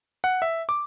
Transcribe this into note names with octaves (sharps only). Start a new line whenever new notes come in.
F#5
E5
D6